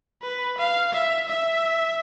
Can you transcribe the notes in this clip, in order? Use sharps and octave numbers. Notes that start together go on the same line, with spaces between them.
B4
F5
E5
E5